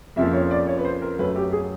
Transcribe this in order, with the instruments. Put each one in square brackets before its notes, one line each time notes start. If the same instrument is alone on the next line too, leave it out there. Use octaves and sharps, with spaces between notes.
[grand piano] F2 C#3 F3 A#3 E5
C#5
D5
C#5
B4
C5
A#4
F#2 C#3 F#3 A3 B4
G4
G#4